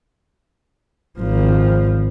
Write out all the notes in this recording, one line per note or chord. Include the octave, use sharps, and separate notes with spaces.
G#1 F3